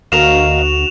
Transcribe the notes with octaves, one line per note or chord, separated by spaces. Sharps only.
D2 F#4 A#4 D#5 F5 E7 F7